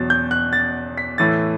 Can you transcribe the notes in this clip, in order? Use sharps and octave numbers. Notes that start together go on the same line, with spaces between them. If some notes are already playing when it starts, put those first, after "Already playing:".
Already playing: E2 B2 F#3 A6
G6
F#6
A6
B6
A2 E3 A3 A6